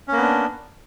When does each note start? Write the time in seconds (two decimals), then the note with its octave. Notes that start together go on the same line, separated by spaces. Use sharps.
0.08 C#4
0.12 A#3
0.17 B3
0.22 D4